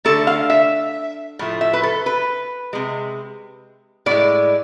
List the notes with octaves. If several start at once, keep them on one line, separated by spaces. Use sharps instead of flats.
D3 A3 A4
F5
E5
A2 F3 A3
E5
B4
A4
B4
C3 G#3
A2 G#3 D5